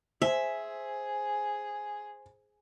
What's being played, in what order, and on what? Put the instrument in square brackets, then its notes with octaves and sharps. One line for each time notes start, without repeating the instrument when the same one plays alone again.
[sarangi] G#4 [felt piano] C5 G#5 [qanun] E5